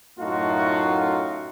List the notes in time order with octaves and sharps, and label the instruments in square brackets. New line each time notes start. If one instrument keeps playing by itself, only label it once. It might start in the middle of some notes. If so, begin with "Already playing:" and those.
[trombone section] F#2 A2 A3 D#4 F4 F#4